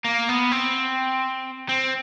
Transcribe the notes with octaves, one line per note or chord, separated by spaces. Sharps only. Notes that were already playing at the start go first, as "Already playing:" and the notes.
A#3
B3
C4
C4